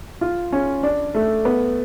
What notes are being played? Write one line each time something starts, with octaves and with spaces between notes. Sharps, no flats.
F4
C#4
D4
A3
B3